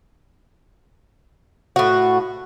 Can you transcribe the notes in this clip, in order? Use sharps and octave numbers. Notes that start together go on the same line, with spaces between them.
A2 F#4